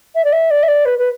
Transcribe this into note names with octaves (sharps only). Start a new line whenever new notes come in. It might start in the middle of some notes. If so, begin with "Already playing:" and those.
E5
D5
E5
D5
E5
D5
B4
B4